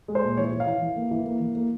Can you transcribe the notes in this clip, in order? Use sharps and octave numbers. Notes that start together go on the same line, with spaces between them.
G#3
C5
A#2
E3 C#5
E3
F5
E3
E3
A#3
E3
A#3
E3
A#3